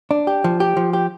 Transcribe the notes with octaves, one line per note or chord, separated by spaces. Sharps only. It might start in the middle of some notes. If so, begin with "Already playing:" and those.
D4
G4
F3
G4
F3
G4